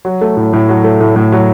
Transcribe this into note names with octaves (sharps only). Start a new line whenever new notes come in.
F#3
A3
A2
A2
F#3
A3
A2
A2
F#3